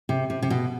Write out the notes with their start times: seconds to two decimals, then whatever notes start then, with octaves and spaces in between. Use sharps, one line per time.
0.09 C3
0.30 C3
0.42 C3
0.50 B2